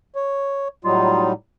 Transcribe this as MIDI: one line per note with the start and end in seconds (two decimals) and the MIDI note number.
0.16 0.68 73
0.85 1.32 45
0.85 1.34 54
0.85 1.32 55
0.85 1.32 63
0.85 1.30 65